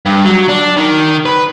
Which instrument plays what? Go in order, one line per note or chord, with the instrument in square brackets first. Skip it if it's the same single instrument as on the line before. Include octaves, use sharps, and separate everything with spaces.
[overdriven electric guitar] G2
F#3
D4
D#3
B4